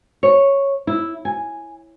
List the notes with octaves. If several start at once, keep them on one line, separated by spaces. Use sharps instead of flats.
C#5
E4
G#5